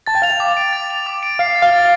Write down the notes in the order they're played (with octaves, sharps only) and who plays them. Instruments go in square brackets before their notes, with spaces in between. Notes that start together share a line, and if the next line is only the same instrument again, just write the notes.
[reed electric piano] A5 [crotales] A6
[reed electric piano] G5
[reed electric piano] F5 [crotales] F7
[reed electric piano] G5
[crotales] D6
D7
A6
F7
D6
D7
[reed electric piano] F5 [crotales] C7
[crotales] A6
[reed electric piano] F5
[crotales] A6